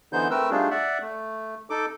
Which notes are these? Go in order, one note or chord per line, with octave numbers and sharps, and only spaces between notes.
D3 E3 B3 D#4 C5 G6
A3 C4 A#4 B4 E6
G3 A3 D4 D#4 F4 G#4
D5 E5 F#5
A3
D#4 A4 D6